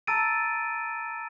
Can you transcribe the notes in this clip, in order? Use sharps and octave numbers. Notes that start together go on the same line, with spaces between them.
A5 A#5 E6 A6 D7 D#7